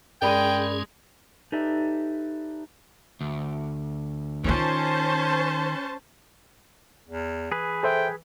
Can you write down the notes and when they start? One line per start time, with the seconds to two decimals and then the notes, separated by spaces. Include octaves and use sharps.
0.22 G2 G#3 C#4 G#4 A#4 D5 G5 B5
1.52 D#4 G4 A4 B4 D5 E5
3.21 D2
4.44 D#3 C#4 D#4 F4 C5 A5
7.08 E2
7.52 E3 G#4 B4
7.83 A4 C5 E5 G5